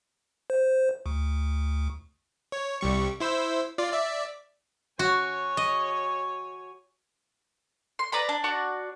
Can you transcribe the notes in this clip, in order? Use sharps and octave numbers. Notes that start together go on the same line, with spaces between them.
C5
D2
C#5
C2 G3 C#6
E4 C5 E6
F4 D5
D5 E5
F#4 C#5 G#5
D#5
C6
B4 D5 A#5 B5
D4
D4 F#4 D5